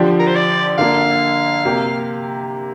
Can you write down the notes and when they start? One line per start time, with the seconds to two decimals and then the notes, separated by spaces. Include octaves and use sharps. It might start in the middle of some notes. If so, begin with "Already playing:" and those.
Already playing: D3 F3 D4 G4
0.19 A#4
0.27 C5
0.35 D5
0.78 D3 A#3 D4 F5
1.65 C3 A#3 G4